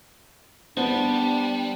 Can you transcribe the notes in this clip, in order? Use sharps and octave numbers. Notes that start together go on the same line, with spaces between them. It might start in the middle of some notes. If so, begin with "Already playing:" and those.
G3 B3 D4 C5